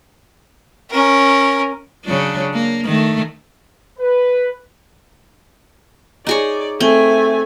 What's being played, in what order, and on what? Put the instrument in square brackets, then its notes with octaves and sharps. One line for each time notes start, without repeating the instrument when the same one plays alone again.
[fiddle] C#4 A#4
[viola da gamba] C#3 F#3 D4
A#3
D#3 A3
[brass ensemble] B4
[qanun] D#4 G#4 C#5 [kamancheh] D5
[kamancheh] A3 G#5 [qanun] C4